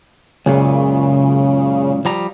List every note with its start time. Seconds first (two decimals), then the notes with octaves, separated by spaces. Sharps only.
0.46 C#2 F#2 A#2 C#3
2.05 F3 G3 A#5